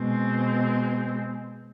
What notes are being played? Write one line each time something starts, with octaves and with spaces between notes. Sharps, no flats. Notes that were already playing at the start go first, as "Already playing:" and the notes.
Already playing: B2 G#3 C4